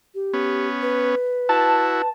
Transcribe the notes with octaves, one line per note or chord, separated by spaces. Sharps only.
G4
B3 C#4
B4
E4 F#4 A5